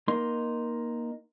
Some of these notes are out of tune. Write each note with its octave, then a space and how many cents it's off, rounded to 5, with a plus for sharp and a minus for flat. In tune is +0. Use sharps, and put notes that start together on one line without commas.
A#3 +20 D#4 +0 C6 +0